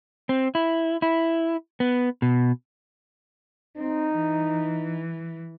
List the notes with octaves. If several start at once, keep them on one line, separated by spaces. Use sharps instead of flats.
C4
E4
E4
B3
B2
C4 D#4
E3